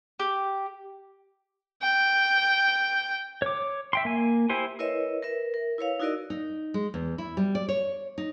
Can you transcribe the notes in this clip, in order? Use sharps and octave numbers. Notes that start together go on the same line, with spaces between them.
G4
G5
C#5 D6
E5 G5 C6
A#3 G#5
E4 G4 C5 G#5 C6
E4 A#4 B4 C#5 D#5 E5
A#4 B4 E5
A#4
E4 B4 C#5 F5
D#4 E4 F#4 A#4 D5 D#5
D#4
G#3
E2
E4
G3
D5
C#5
D#4